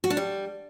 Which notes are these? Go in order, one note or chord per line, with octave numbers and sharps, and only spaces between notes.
F#4
D4
G3